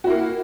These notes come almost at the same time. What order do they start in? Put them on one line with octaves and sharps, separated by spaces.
F#4 E4 A#3